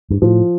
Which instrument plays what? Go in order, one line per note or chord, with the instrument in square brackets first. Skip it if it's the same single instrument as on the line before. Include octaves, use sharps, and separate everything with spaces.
[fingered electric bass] G2
[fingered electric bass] A2 [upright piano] F3